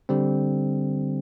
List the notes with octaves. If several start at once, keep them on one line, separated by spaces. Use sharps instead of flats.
D3 G3 C4